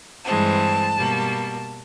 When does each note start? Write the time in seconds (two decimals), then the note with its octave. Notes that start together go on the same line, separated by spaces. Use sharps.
0.24 G2 E3 G#3 C4 A5
0.97 B2 G3 A#3